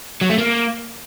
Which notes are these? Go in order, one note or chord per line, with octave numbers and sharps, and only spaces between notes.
F#3
A3
A#3